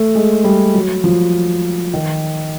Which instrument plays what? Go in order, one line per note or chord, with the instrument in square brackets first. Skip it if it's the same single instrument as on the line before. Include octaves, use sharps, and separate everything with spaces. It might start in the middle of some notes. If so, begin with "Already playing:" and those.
Already playing: [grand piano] A3
G#3
G3
F#3
F3
D#3